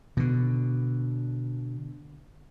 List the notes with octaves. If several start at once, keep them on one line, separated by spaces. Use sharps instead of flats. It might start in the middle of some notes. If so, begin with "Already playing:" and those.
B2 D3